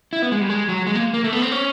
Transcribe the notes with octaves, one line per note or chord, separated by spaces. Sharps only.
E4
B3
G#3
G3
G#3
F#3
G#3
A#3
A#3
A3
B3
C4
C#4